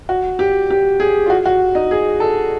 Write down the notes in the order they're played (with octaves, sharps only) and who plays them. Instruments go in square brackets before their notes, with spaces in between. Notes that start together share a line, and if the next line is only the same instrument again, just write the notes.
[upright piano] F#4
G4
G4
G#4
F4
F#4
F#4
D#4
G#4
A4